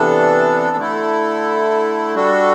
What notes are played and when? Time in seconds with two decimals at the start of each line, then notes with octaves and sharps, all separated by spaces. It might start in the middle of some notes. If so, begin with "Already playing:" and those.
Already playing: C3 E3 B3 D4 A4
0.77 D3 A3 E4 A4
2.15 G3 D4 F#4 A4